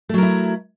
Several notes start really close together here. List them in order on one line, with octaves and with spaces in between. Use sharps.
A3 F#3 A#4 E4